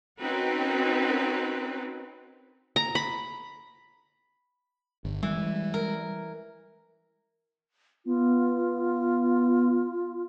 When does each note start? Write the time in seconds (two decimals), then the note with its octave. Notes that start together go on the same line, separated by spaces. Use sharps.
0.22 C4 C#4 D#4 F#4 A#4 B4
2.76 A#5
2.95 B5
5.05 G1
5.23 E3 G3 G#3
5.74 A#4
8.05 B3 F4